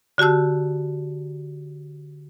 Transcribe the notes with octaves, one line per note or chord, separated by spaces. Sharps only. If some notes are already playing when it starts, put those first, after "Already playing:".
D3 F#4 G4 A5 E6